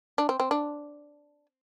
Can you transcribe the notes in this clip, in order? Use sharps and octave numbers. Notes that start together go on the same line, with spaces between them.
D4
C4
C4
D4